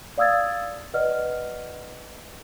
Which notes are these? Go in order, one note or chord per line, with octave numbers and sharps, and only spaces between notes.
D5 F5 D#6 E6 G#6 A6
B4 D5 D#5 F#5 F6